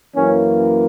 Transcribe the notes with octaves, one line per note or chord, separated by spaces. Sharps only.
F#2 E3 A#3 C#4